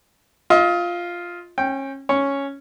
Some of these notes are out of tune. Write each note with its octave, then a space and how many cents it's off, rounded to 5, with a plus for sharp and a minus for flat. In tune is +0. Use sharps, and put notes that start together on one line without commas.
F4 +0 D#5 +35
C#4 -30 G5 +0
C#4 +0 C#5 +0